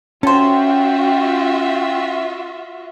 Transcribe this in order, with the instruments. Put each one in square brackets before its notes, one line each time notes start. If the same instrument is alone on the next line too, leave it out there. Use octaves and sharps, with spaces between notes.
[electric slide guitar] C#4 C#5 [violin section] F4 F#4 E5 [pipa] A4 C5 [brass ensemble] G5